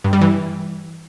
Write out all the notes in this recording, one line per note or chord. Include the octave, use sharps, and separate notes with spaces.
G2
G3
E3